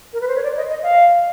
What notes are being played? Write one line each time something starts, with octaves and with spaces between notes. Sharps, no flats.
A#4
B4
C5
C#5
D5
D#5
D#5
F5